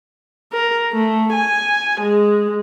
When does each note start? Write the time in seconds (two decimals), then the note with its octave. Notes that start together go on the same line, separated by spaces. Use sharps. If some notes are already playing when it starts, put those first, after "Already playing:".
0.53 A#4
0.92 A3
1.33 G#5
2.01 G#3